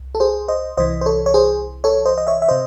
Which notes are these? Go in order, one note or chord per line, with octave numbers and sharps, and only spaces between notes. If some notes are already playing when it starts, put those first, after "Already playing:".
Already playing: C2
A4
G#4 C5
C5 D#5
C2 C3 E3 C5 D#5
C5
A4 C#5
C#5
G#4 C5
A4 C#5
C5 D#5
D#5
C#5 E5
E5
C3 C5 D#5